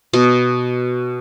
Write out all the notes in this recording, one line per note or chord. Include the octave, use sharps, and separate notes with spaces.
B2